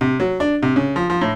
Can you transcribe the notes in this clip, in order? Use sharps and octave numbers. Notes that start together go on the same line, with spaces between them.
C3
F#3
D4
C3
C#3
F3
F3
A2